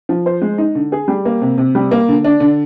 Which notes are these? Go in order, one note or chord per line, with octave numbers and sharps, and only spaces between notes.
F3
C5
G#3
D#4
D3
G#4
G3
A#3
C3
C3
G3
A#3
D3
D4
D3